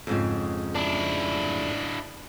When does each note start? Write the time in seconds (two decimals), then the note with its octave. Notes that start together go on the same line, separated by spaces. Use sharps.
0.07 F2 G#2 C#3
0.75 D4 E4